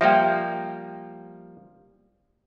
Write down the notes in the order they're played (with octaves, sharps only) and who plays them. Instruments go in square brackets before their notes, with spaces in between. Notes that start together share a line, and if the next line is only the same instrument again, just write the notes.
[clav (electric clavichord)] F3 G3 A#3 [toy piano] E5 G5